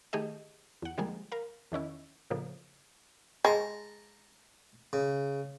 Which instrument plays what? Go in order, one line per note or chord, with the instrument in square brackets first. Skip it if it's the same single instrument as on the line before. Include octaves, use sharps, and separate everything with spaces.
[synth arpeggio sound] D#3 A3 G4 G#4 D#5
E2 F#5
D3 F3 G3 G#3 A#3 G#4
A#4 F5
E2 D#3 C#4 E4
A2 C#3 F3 A#3
[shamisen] G#3 [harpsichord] A5 A#5
[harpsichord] C#3